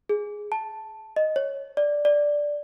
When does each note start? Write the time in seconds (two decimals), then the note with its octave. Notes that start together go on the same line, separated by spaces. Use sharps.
0.09 G#4
0.52 A5
1.16 D#5
1.36 C#5
1.77 D5
2.05 D5